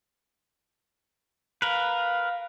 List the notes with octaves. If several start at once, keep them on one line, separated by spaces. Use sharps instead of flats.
A#4 B4 F5